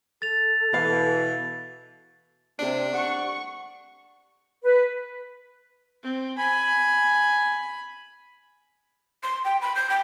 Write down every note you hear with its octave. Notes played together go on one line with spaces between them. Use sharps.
A4 A6 F7
B2 E3 B4 F5
C3 D4
F#5 C#6
B4
C4
G#5 B5
C6
G5
B5
G6
G5